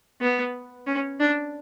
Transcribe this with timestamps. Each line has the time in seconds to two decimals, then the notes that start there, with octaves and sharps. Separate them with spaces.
0.21 B3
0.87 C#4
1.20 D4